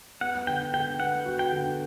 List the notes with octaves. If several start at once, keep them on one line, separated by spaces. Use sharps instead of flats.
B3 F#5
D3 G5
D3 G5
B3 F#5
F#4
G5
D3